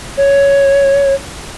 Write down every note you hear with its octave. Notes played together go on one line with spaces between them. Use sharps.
C#5